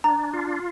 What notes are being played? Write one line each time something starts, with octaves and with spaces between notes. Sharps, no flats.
D4 A#5
F4